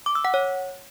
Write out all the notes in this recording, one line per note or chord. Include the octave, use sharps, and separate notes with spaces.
D6
E6
F#5
C#5